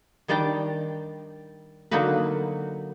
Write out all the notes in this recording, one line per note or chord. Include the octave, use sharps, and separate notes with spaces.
D#3 G3 D4 D5 G5 A#5
D3 F#3 A#3 D#4 F#4 B4